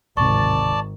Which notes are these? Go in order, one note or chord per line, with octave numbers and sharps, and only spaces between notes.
D1 G#1 C3 D#3 D5 A5 C#6